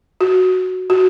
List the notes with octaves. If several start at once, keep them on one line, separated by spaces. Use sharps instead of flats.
F#4
F#4